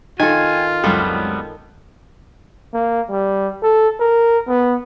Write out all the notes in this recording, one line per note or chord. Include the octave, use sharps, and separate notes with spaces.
D#3 F4 A4 G5 G#5
C#2 F#2 G3 B3 C4 A4 F6
A#3
G3
A4
A#4
B3